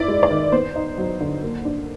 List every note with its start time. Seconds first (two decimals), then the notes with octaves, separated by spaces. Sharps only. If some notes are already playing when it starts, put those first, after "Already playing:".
Already playing: E4 D5
0.08 G#3
0.23 D5
0.31 D#3
0.52 B3 C5
0.76 D#4
0.98 F#3
1.21 D3
1.43 A#3
1.65 D4